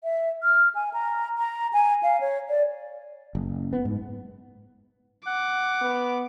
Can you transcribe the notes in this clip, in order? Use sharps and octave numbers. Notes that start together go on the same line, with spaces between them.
E5
F6
G#5
A#5
A#5
G#5
F5
C#5
D5
F#1
B3
G#2
F#5 D6
B3